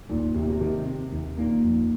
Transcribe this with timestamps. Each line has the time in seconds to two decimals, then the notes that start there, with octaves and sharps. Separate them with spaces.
0.09 D#2 A#2 D#3
0.34 D#2 C3
0.42 A#2
0.49 C3
0.61 C3 D#3
0.86 C4
1.12 D#2
1.38 A#2 D#3 A#3
1.64 F2